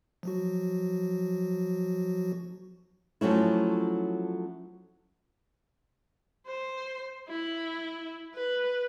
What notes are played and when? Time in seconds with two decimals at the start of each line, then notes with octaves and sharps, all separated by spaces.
0.23 F3 F#3 F#4
3.21 F3 F#3 A3 C#4 E4
6.47 C5
7.28 E4
8.34 B4